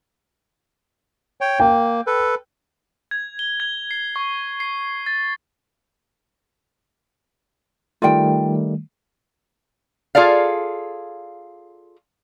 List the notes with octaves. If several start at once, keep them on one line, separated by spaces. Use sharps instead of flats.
C#5 G5
A#3 G5
A4 B4
G#6
G7
G#6
C7
C#6
C7
A6
D#3 G3 A3 F4 D5 G5
F4 G#4 A4 D5 F5